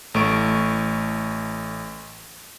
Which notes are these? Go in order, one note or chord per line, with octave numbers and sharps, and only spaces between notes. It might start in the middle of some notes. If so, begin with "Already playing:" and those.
A1 A3 C#6 D7